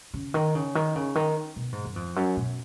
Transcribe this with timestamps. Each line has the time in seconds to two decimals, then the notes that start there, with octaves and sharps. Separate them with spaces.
0.14 C#3
0.34 D#3
0.55 C#3
0.75 D#3
0.96 C#3
1.15 D#3
1.56 B2
1.72 G#2
1.85 F#2
1.96 F2
2.16 F#2
2.37 B2